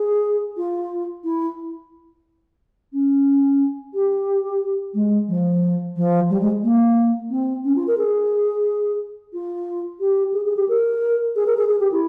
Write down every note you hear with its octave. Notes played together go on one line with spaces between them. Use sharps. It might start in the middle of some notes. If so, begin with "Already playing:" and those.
Already playing: G#4
F4
E4
C#4
G4
G#3
F3
F3
G3
G#3
A#3
C4
C#4
F4
A#4
G#4
F4
G4
G#4
G#4
G4
A#4
G#4
A#4
G#4
G#4
G4
E4